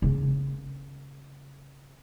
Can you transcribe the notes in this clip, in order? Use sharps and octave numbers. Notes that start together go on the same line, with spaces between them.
C#3 A#3